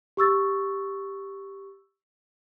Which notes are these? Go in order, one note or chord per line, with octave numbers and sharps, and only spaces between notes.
G4 C#6 E6 A6